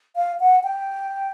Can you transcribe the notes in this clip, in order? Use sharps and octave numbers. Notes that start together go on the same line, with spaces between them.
F5
F#5
G5